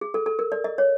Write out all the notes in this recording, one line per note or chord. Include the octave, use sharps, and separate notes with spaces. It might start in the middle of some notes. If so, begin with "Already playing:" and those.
G#4
A4
A4
A#4
D5
D#5
C#5